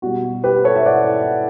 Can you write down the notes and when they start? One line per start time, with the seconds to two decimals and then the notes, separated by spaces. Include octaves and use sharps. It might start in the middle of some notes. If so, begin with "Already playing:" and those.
0.02 B2 G3 F#4
0.44 G4 B4
0.64 A4 C#5
0.76 E5
0.85 D5 F#5